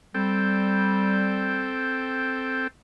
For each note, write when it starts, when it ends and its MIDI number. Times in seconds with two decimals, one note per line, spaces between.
0.14 1.76 55
0.14 2.67 60
0.14 2.67 69
0.14 2.67 79